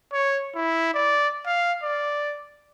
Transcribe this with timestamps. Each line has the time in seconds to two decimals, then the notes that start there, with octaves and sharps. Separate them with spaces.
0.13 C#5
0.55 E4
0.94 D5
1.46 F5
1.83 D5